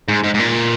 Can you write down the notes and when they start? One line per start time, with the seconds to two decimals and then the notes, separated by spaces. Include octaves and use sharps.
0.08 G#2
0.24 G#2
0.34 G#2
0.39 A#2